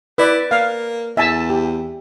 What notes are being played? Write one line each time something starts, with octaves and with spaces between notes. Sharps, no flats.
E4 B4 D5
A#3 F5
E2 E5 G#5 A5
G4